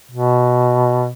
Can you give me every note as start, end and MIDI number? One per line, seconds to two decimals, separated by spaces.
0.11 1.12 47